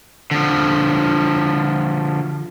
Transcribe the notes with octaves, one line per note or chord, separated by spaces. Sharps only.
D3 F3